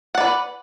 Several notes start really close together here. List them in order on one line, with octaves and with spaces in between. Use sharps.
F#5 D5 B4